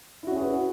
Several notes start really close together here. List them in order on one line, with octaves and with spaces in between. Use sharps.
E4 F#4 C#4 G#4 B4